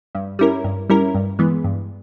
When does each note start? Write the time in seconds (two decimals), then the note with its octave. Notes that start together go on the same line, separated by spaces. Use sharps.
0.15 G2
0.39 G3 C#4 E4 A#4
0.64 G2
0.89 G3 C#4 E4 A#4
1.15 G2
1.39 E3 G#3 B3
1.64 G2